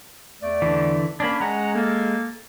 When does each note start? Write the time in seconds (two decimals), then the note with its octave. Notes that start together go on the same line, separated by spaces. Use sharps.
0.42 E2 A3 D5
0.62 D3 E3
1.20 A#3 C#4 D4 B5
1.41 G#3 C#4 F#5 A#5
1.74 A#3 A4